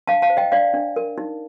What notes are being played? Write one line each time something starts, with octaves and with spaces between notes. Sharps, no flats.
D4 F5 A5
F5 A5
C5
D#5 G5
D4 D5 F5
D4
A#4
D#4